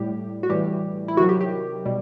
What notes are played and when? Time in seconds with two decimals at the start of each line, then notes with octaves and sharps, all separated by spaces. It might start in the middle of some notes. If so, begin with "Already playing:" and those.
Already playing: A2 G3 G4
0.43 F#4
0.49 A2 E3 G3 G4
1.08 E4
1.17 C3 D#3 F#3 F#4
1.29 G4
1.41 G4
1.85 B2 G3